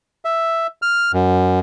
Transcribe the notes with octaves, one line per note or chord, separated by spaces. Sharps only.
E5
F6
F#2